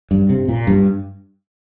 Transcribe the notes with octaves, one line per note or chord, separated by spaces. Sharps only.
G2
C3
A#2
G2